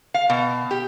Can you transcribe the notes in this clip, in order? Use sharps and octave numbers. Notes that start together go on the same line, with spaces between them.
F5
B2
G4